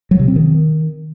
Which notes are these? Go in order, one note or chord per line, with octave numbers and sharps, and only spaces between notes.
F#3
C3
C4
D#3